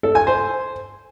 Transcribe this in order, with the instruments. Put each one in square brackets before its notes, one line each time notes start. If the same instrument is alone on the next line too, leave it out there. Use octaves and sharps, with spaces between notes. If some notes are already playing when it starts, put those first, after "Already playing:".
[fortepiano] A4
G#5
C5